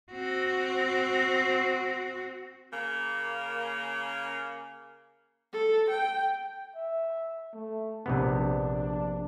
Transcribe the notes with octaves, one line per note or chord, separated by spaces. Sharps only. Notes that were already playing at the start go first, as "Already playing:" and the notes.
C4 F#4
C#3 A#3
A4
G5
E5
A3
A#1 C3 B3 D4